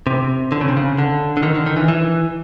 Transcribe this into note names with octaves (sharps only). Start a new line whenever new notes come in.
C3
D3
C#3
C3
C#3
D3
D3
D#3
D3
D#3
E3
E3